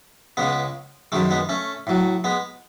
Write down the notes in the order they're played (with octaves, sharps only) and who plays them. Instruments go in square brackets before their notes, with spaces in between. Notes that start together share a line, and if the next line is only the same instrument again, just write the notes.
[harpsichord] C#2 C#3 G#3 B3
F#2 D#3 G#3 A3
G#3 B3
A3 C#4
A2 F#3
G#3 B3